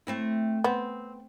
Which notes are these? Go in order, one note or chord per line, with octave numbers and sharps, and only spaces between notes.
A3 C4 E4
B3 C4